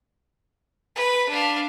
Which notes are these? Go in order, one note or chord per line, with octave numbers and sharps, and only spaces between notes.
B4
D4 F5